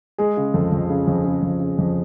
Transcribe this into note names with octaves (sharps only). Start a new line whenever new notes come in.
G#3 G#4
C#3
F2 A4
F2
C#3
F2
C#3
F2
C#3
F2